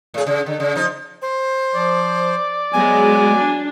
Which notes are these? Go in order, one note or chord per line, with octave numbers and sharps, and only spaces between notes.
A2 G#4
C#3
D3
C#3
F3 D#4
C5
F3 D5
F#3 G#3 B3 G#5
D4